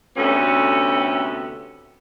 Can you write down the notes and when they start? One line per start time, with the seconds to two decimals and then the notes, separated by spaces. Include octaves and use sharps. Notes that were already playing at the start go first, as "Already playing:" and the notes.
0.17 D2 C3 B3 C#4 A4